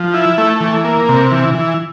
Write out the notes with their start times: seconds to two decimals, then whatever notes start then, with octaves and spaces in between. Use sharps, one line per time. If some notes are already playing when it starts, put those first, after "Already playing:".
Already playing: F3
0.14 E4
0.38 A3
0.61 E3
0.84 A#3
1.08 C3
1.31 E3
1.54 E3